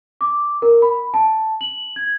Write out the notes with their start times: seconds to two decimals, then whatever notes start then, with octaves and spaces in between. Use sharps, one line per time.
0.21 D6
0.62 A#4
0.82 B5
1.14 A5
1.61 F#7
1.96 G#6